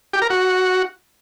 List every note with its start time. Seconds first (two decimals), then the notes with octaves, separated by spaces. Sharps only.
0.13 G4
0.22 A#4
0.30 F#4